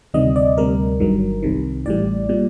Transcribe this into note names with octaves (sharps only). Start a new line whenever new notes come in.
D2 C3 D#3 G3 D#5
D5
D2 C3 G3 A#4
G1 G2 D#3 F#3
C2 C3 D#3
A1 A2 G3 D5
A#2 G3